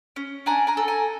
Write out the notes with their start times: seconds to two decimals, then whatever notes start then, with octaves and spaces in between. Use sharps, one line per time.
0.16 C#4
0.46 D4 G#5 A#5
0.67 G#5 A#5
0.77 A4
0.88 G#5 A#5